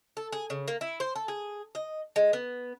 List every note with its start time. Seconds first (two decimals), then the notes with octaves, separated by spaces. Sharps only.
0.17 A4
0.32 G#4
0.50 C#3
0.68 A#3
0.81 E4
1.00 C5
1.16 A4
1.28 G#4
1.75 D#5
2.16 G#3
2.33 B3